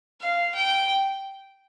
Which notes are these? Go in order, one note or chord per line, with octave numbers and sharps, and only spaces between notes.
F5
G5